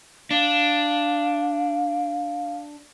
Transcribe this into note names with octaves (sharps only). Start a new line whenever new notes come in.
D4 F5